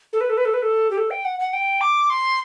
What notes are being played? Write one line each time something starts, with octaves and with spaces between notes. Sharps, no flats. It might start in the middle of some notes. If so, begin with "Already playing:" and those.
A4
B4
A4
B4
A4
B4
A4
G4
A4
G5
F#5
F#5
G5
D6
C6